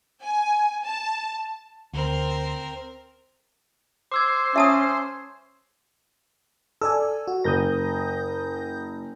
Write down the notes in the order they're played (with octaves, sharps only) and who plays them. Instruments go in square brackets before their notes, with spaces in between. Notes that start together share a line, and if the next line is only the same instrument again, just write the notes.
[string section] G#5
A5
[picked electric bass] D2 [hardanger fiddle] C4 A#4
[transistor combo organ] C5 [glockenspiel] D6 E6 G#6
[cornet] C#4 [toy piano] E5 A5 D#6
[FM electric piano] A4 D5 G#5 [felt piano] E6
[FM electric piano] F#4
[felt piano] F#1 [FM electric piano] D#6 G6 A#6